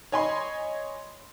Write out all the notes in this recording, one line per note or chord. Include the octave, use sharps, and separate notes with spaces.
C#5 D#5 G#5 B5 C6